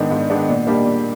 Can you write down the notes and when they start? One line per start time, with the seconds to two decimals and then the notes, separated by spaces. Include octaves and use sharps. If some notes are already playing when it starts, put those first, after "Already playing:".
Already playing: G#2 D#3 G#3 B3 D4
0.11 G#2
0.30 D#3 G#3 B3 D4
0.48 A#2
0.67 G3 A#3 D4 G4
0.86 A#2